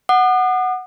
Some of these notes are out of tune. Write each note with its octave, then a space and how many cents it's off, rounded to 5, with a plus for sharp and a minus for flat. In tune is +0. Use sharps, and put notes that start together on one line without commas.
F#5 +0 D#6 -45